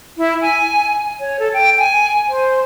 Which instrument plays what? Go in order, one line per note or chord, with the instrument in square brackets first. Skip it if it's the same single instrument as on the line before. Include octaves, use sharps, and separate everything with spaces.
[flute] E4
G#5
C#5
A4
G5
G#5
C5